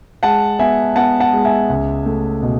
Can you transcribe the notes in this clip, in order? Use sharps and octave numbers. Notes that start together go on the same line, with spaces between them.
G#3 F#5 A5
B3 E5 G#5
B3 F#5 A5
F#5 A5
G#3
E5 G#5
C#2
A3
B2